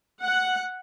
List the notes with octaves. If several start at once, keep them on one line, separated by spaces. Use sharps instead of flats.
F#5